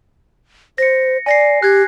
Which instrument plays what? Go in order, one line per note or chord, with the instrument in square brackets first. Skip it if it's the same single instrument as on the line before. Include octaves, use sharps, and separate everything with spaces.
[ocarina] C5 [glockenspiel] A#6 C#7
[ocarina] D5 [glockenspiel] G#5 A#6 C7
[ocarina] G4 [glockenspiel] F#6 G#6